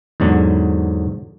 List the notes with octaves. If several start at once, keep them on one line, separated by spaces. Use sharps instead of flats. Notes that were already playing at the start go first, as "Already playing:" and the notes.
E2 G#2 D3 F#3